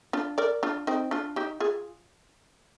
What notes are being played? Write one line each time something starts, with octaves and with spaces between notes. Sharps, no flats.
D4 F4
A#4 D5
D4 F4
C4 D#4
D4 F4
D#4 G4
F4 G#4